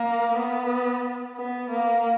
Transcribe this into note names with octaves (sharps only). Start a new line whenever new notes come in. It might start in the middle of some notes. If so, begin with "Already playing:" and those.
Already playing: A#3
B3
B3
A#3